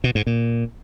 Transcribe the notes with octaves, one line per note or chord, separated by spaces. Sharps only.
B2
G#2
A#2